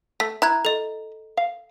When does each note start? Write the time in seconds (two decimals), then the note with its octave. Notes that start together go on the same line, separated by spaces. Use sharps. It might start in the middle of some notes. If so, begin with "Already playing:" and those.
0.20 A3 B6
0.42 E4 A#5 F#6 G#6
0.65 A4 D#5
1.37 F5